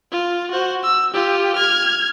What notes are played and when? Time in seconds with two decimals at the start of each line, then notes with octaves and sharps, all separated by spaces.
0.12 F4
0.51 F#4 C5
0.83 E6
1.14 F4 G4
1.56 F6 G#6